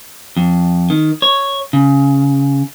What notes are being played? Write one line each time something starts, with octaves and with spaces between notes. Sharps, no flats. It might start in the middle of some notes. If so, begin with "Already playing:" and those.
F2
D#3
C#5
C#3